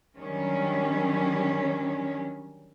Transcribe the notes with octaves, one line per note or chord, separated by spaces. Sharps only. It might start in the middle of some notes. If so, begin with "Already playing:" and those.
D3 D#3 F#3 G3 C#4